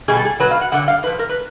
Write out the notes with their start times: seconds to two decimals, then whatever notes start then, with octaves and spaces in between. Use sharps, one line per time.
0.08 B2 G3 G#4
0.17 A4
0.25 G#4
0.40 B2 F#3 B4
0.51 F5
0.61 F#5
0.72 G2 D3 F3 F#5
0.88 F5
1.03 A2 B4
1.07 F3
1.19 A#4
1.29 B4